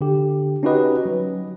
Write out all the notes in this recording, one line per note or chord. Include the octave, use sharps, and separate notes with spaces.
D3 G4
C#4 D#4 F#4 G4 B4 D#5
F#3